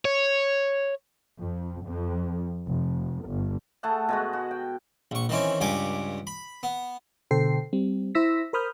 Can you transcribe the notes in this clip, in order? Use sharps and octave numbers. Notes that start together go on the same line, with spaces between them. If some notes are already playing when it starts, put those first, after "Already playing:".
C#5
F2
F2
F1
G1
A3 G#4 A4 F#5
B2 G#3 F#4
F#4
G5
A#1 C#6
D#3 E3 C4 C#4
C#2 G2 G4 G#5 D6
B5
B3
B2 D3 A4 C5 G5 C7
G3 C4
E4 C5 E6 A#6 B6
A#4 C5 B5 D#6 F6 G6